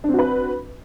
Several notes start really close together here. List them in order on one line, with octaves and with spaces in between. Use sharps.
D4 C4 F#4 B4